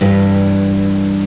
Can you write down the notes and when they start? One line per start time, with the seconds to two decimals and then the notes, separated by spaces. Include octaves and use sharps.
0.01 G2 E3 G3